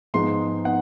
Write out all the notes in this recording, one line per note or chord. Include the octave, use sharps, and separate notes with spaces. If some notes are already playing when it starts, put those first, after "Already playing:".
G#2 F3 G#3 B3 D#4 C6
B3 D#4 F#5